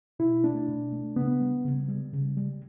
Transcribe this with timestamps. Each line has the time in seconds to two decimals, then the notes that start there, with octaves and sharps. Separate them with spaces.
0.19 B2 E4
0.44 A3 D4
0.68 B2
0.93 A3
1.16 C#3 B3
1.41 G3
1.64 C#3
1.89 G3
2.13 C#3
2.37 G3